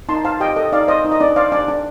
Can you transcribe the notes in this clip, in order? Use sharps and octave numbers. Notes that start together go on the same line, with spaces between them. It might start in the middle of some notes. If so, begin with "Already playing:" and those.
D#4 A5 C6
C5 F5 A5
G4 D#5 G5
A4 D#5
D#4 D5 F5
C5 D#5
D#4
D#5
D4 D5
C5 D5 F5
D4 D5
D4